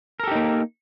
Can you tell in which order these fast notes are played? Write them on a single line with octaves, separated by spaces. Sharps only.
A#4 A4 G4 D#4 A#3